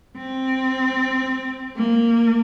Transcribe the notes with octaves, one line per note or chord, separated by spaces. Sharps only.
C4
A#3